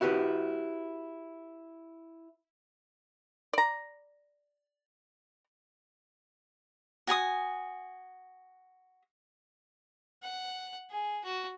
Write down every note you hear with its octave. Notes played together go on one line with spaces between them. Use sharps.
E4 F#4 G4 B4
D5 A#5
F#4 G#5 B5 D#6
F#5
G#4
F#4